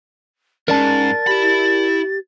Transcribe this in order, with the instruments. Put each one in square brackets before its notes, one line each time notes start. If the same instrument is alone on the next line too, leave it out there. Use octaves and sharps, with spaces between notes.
[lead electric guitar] E2 G#2 [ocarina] C#4 [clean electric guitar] A#4 D5 A5 [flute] A6
[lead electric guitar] E4 B5 [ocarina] G4